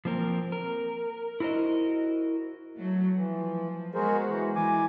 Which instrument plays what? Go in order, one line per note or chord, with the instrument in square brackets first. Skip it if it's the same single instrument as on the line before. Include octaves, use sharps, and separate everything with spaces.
[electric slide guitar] F3 A#3 C4 A#4
A#4
E4 F#4 A#4 C5 D#5
[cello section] F#3 A3
[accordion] E3 [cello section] F3
[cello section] G#3 B3 F#4 [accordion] G#4 A#4 C5
[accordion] E3
[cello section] E3 [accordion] G#5 D6